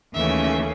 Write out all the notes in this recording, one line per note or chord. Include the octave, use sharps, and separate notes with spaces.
D#2 C#3 E3 A3 C#4 E5